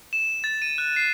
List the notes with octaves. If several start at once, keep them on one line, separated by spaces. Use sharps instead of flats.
E7
A6
D#7
F#6
C7